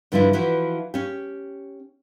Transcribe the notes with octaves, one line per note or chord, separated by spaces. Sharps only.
G2 D3 F3 G3 D4 E4
E3 F3 E4 F#4
C#4 G4